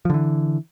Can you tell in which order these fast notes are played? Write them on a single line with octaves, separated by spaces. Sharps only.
F3 D3 E3